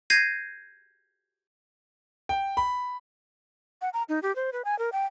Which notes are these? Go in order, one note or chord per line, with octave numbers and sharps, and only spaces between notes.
G6 G#6 A#6 C7 D#7
G5
B5
F#5
A#5
D#4
G4
C5
B4
G#5
A#4
G5